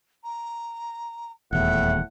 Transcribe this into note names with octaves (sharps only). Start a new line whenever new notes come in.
A#5
D#1 E2 A2 E5 F#5